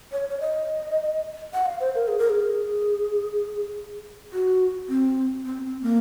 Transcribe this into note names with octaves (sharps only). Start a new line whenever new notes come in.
C#5
C#5
D#5
F#5
F5
C5
A#4
G#4
A#4
G#4
F#4
C4
C4
C4
A#3